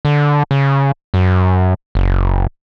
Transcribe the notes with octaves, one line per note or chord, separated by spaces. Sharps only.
D3
C#3
F#2
F#1